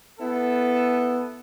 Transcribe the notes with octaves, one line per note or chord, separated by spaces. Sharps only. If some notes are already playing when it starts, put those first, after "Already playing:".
B3 E4 A4